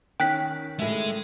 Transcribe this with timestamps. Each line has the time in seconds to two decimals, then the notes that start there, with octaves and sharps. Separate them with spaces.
0.20 D#3 C#4 G5 F#6 B6
0.79 A2 G#3 E5